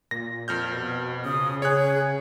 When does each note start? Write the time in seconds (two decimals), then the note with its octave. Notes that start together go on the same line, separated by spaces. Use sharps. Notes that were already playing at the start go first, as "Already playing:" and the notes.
0.11 A#2 A#6
0.48 F2 F6 G6
0.73 B2
1.25 C#3 D#6
1.62 G#4 C#5 F#6